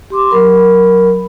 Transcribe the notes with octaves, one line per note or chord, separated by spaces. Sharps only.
G4 C6 D6
F#3 A#4 B5